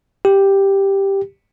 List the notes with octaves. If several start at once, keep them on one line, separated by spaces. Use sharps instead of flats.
G4